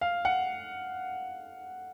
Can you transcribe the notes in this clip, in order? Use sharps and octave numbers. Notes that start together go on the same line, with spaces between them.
F5
F#5